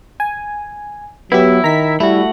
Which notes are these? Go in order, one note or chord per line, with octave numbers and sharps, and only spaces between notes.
G#5
F#3 B3 E4 G4 E5
D#3 A#5 B6
G3 A3 E4 F#4